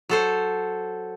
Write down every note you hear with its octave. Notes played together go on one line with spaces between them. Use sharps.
F#3 A4 C5